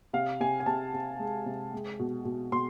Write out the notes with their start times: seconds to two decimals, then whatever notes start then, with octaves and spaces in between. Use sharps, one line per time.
0.13 C3 F5
0.40 C3 G#5
0.60 G#5
0.66 C3 A5
0.94 C3
1.19 G#3
1.46 C3
1.73 G#3
1.99 B2
2.25 B2
2.52 B2 C6